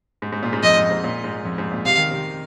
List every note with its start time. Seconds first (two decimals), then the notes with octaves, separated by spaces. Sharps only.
0.22 G#2
0.32 G#2
0.43 A#2
0.53 G#2
0.63 F2 D#5
0.77 G#2
0.90 G#2
1.04 A#2
1.24 G#2
1.45 F2
1.58 G#2
1.71 A#2
1.86 C3 F5
1.98 D#3
2.11 C3